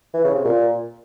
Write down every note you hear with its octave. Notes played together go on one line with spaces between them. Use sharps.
E3
C#3
C3
A#2